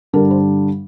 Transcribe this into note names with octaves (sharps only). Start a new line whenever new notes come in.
G2 D3 G3 D4 A#4
C5